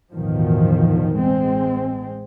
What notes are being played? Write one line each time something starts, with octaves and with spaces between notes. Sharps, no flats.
A1 E2 G2 B2 D#3 F3
A1 G#3 C4